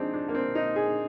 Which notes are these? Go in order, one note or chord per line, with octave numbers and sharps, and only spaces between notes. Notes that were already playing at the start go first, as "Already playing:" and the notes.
Already playing: F3 G#3 C4 D4 D#4
D4
A#3
C4
D#4
G#4